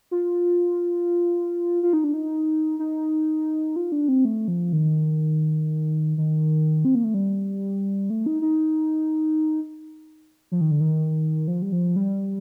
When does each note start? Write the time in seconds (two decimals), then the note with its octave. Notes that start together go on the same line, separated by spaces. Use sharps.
0.11 F4
1.83 F4
1.93 D#4
2.04 D4
2.14 D#4
2.79 D#4
3.76 F4
3.92 D4
4.08 C4
4.25 A3
4.48 F3
4.73 D#3
6.18 D#3
6.85 C4
6.95 A#3
7.04 A3
7.14 G3
8.10 A3
8.26 D#4
8.42 D#4
10.52 F3
10.61 D#3
10.71 D3
10.81 D#3
11.48 F3
11.62 G3
11.72 F3
11.96 G3